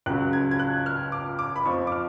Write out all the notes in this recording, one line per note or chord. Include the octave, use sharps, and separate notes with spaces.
C#2 C#3 F#3 F#6
G#6
G#6
F#6
F6
D6
D6
B5
F2 F3 C#6
D6
F6